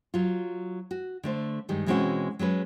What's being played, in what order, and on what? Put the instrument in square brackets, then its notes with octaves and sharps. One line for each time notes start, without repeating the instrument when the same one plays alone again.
[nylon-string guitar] F#3 F4
F#4
D3 A3 C5
G2 D#3 G3 G#3
B2 E3 G#3 C4 C#4 F#4
F#3 G#3 C#4 B4